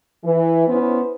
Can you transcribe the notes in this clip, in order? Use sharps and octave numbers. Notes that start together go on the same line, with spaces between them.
E3
B3 C#4 E4 B4 C5